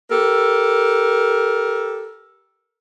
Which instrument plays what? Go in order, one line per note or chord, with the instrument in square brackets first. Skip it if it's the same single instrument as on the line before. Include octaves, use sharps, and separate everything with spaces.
[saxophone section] G4 A4 A#4